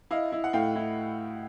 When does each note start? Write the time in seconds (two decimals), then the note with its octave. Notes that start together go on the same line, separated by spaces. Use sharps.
0.11 E4 D#5 F5
0.32 E4
0.44 F#5
0.53 A2 F5 G5
0.76 E4